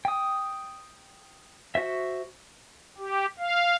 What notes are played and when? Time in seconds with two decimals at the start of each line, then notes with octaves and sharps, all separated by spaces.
0.05 G5 D#6
1.75 F#4 C5 E5
2.98 G4
3.39 F5